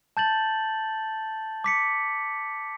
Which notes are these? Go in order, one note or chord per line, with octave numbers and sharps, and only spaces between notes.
A5 G6 A6 F#7
D6 B6 C#7